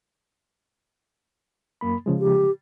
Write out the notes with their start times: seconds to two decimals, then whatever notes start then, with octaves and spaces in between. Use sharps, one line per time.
1.81 F#2 A#3 B5
2.06 C#3 F3 G#3
2.19 G4